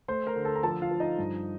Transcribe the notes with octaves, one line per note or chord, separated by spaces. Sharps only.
A3 C5 C6
A#4 A#5
D3
A4 A5
A#5
F3 A4 A5
F4 F5
F3
D#4 D#5
G2